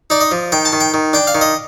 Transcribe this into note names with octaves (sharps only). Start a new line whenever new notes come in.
D#4 D5
D#5
F3
D#3 G5
A5
D#3
G5
D#3
D4 G5
F5
D#3
D#5